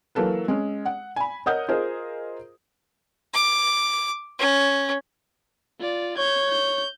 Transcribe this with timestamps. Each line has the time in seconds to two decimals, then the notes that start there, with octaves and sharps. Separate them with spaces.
0.15 E3 F#3 A#3 A4 B4
0.48 G#3 C#4
0.85 F#5
1.16 G#5 B5
1.46 A#4 C#5 D#5 F#5 D#6 G6
1.68 F4 G#4 A#4 C5 D#5
3.34 D6
4.39 C#4
5.79 F4 D5
6.18 C#5 G6 G#6
6.51 G6